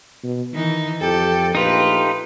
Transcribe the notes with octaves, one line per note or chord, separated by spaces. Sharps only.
B2
D#3 E3 D#4
F2 G4 A4 G5
A#1 A3 D#4 F4 G4 B4